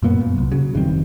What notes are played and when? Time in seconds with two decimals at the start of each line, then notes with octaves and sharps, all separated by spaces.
0.02 F#2 A#2 A#3 B3
0.20 F#2
0.35 E1 C2
0.52 C#3 F#3
0.74 F1 G2 D#3 C4